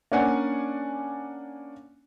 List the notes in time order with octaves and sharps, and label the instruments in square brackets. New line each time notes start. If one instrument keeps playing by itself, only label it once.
[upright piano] A#3 C#4 D4 D5 F#5 G#5